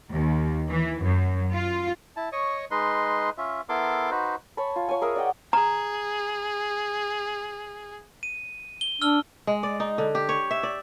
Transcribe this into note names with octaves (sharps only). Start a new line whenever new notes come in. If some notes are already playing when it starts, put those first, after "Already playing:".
D#2
E3
F#2
F4
E4 A5
C#5 D#5 C#6 D#6
G#3 D#4 B4 D#5 C6
C#4 F4 E5
B3 E4 A4 A#4 C6 D6
D#4 F#4 B4 C5
C#5 G#5 A5 B5
F4
C#5 G#5
G#4 A#4 E5 D#6
D5 D#5 F#5 G5
G#4 A#5
D#7
G7
D4 E6 F6 G7
G#3
D5
D#4
D3
G4
C#5
E5
D5